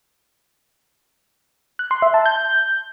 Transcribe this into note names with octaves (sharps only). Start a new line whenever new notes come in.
F#6
C6
E5
A5
G6